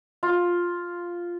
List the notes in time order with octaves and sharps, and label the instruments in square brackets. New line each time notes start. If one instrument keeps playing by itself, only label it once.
[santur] F4